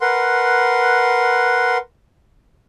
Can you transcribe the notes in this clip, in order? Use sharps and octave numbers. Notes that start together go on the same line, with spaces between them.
A#4 B4 F#5 C6